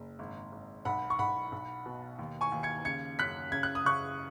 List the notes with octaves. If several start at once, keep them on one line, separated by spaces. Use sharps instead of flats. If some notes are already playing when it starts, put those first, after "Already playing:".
Already playing: F#1
G#1
G#1
B1 F#5 B5
C#6
B1 F#5 B5
B1
B2
D#2
G#5 C#6
D#2
G#6 C#7
C#3 G#6 C#7
F#2 F#6 B6
C#3 G#6
F#6
D#6
C#3 C#6 F#6